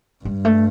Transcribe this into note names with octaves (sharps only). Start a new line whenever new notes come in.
G2 G3
A3